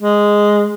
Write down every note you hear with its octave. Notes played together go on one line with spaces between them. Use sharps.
G#3